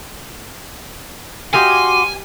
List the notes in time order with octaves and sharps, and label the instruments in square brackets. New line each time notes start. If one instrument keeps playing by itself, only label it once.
[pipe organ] F#4 F#5 D6 [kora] G4 D#5 F5 [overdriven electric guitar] G#5 [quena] C6